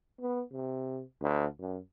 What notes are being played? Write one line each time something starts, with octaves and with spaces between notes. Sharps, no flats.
B3
C3
D2
F#2